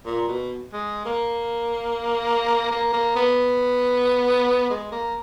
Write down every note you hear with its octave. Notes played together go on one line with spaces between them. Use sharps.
A#2
B2
G#3
A#3
A#3
A#3
B3
G#3
A#3